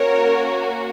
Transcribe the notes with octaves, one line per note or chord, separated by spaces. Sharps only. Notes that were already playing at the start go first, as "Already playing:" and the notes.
Already playing: A#3 C#4 F#4 A#4 C#5